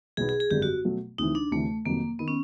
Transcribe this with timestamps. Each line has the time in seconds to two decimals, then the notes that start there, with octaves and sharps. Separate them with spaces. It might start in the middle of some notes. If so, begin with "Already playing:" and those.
0.17 B1 B2 F#3 B3 D#4 G#4
0.29 G#4
0.40 G#4
0.51 G#1 F#2 D3 G3 G4
0.62 F#4
0.85 B2 F#3 A3
1.18 D2 C3 E3 D#4
1.35 D4
1.52 D2 C3 E3 A3
1.86 F2 C3 D#3 F#3 A#3
2.19 D#3 B3
2.28 C#4